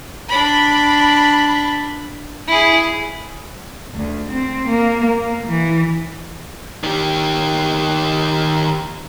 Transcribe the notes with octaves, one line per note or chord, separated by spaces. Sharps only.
D4 B5
E4 G#4
D2
C4
A#3
A#3
E3
D#3 G4